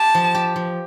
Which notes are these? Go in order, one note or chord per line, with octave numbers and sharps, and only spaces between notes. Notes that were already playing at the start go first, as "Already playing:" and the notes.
Already playing: G4 A5
F3
G4
F3